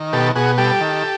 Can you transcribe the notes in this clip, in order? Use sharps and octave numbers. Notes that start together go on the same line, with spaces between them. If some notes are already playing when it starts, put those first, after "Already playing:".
Already playing: D#3
B2 G4 A4
B2 F#4 G#4
G3 G4 A4
D#3